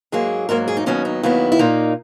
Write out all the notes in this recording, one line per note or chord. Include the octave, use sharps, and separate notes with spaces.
G#2 F#3 A#3 G#4
G#2 F#3 A#3 A#4
G#4
D#4
D#2 D#3 F#3 B3 C#4
D#4
D#2 D#3 F#3 B3 E4
E4
A#2 A#3 D#4